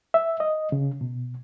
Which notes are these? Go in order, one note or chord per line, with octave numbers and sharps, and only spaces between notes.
E5
D#5
C#3
B2